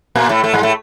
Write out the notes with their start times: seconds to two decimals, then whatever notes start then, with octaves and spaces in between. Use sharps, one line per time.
0.16 A#2 A#3
0.29 A2 A3
0.44 A2 A3
0.54 G#2 G#3
0.63 A2 A3